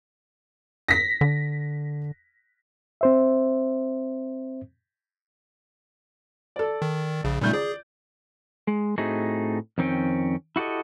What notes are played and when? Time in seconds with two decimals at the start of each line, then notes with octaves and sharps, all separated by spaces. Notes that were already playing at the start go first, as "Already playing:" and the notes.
0.89 A#6 B6
1.21 D3
3.01 C4 C5 E5
6.56 A4 D5
6.82 D#3
7.24 A#1 C#3
7.41 C#2 A#2 D#3 G3 A3 G6
7.53 G#4 D5
8.67 G#3
8.98 A2 A3 C4 D#4 F#4 G#4
9.78 F2 D#3 C4 C#4 G5
10.56 E4 F#4 G4 A4 D#5